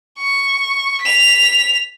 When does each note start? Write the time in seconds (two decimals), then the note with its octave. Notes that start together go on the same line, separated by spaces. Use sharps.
0.18 C#6
1.01 B6 F7